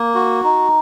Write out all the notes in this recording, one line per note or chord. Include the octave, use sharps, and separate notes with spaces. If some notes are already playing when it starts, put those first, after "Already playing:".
Already playing: A#3
F#4
D#4